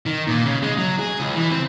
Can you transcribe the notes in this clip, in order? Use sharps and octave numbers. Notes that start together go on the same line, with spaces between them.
D#3
A#2
C#3
G#3
F#3
G#4
C#2
E3
C4